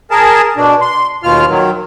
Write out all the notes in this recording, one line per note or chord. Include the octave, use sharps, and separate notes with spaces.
G#4 A#4 A5
B2 D4
C6
D#2 B2 F4 F6
D#3 F#3